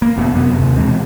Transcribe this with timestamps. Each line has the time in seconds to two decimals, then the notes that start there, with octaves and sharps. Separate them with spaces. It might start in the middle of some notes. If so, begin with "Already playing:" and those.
0.02 A#3
0.17 F#1 E2 B2
0.33 F#2 C3 B3
0.59 D#2 C3
0.76 B2 E3 G#3 C4